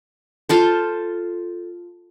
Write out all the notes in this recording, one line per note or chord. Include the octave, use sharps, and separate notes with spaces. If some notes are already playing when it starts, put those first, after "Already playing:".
F4 A4 C5